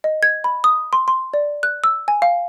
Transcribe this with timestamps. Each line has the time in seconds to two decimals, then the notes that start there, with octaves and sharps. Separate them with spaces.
0.04 D#5
0.23 G#6
0.44 B5
0.64 D#6
0.93 C6
1.08 C6
1.34 D5
1.63 F#6
1.84 E6
2.08 G#5
2.22 F5